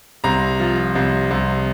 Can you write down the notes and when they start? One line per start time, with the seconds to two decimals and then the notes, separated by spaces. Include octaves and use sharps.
0.24 C2 A#5
0.60 F3
0.95 C2
1.31 C2